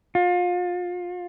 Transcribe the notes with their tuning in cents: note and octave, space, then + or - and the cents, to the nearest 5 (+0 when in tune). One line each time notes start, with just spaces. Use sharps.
F4 +30